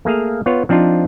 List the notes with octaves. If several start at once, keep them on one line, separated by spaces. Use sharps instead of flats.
A3 A#3 G#4 F5
B3 F4 C#5
F3 C4 D4 D#4 F4